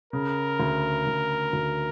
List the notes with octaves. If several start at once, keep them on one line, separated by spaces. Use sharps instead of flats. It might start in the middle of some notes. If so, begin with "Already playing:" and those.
C#3 A#4
D2
D2
D2